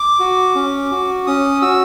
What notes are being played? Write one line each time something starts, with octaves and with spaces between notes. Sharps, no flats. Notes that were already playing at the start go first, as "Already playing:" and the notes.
Already playing: D6
F#4
C#4
F#4
C#4 D#6
F#4 E6